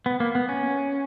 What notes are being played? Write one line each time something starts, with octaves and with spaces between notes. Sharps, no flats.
B3
A#3
B3
C#4